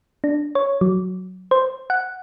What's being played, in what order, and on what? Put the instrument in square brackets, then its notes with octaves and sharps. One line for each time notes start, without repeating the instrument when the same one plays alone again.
[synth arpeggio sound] D4
C#5
F#3
C5
F#5